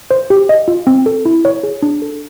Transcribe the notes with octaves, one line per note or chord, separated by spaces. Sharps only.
C5
G4
D#5
F4
C4
A4
E4
C#5
G#4
D4
A4